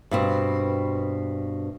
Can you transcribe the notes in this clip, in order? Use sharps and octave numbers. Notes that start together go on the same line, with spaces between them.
G2 B2 C4